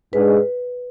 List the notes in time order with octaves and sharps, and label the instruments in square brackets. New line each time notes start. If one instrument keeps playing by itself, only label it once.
[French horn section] G#2 G#3 D4 G#4 [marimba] B4